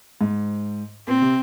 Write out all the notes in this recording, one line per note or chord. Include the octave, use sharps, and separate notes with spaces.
G#2
A#2 C4
C3